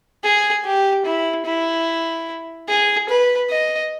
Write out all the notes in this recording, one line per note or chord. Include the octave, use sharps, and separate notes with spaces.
G#4
G4
E4
E4
G#4
B4
D#5